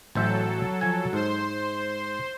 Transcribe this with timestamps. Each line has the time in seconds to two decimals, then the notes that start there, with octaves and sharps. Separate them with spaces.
0.15 A1 F#3 A4 C5 E5
0.81 F3 G#5
1.13 G#2 C5 C6